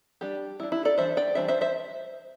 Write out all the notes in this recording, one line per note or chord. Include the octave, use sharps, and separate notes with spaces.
G3 D4 G4
G3 D4 E4
E4
A4 D5
E3 G3 D4 C5 E5
D5 G5
E3 G3 D4 C5 E5
C5 E5
C5 E5